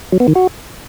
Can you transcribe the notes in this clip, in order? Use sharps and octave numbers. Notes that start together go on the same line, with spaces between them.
F#3
B3
D#3
F#4